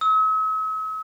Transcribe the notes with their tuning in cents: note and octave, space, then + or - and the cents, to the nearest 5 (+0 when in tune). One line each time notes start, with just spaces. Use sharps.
E6 -45